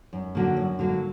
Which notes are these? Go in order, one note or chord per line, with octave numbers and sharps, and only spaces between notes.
F#2
D3 F#3 A#3
F#2
D3 F#3 A#3